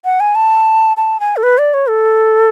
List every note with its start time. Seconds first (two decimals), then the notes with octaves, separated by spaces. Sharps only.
0.05 F#5
0.20 G#5
0.35 A5
0.97 A5
1.20 G#5
1.37 A4
1.43 B4
1.58 D5
1.74 C#5
1.89 A4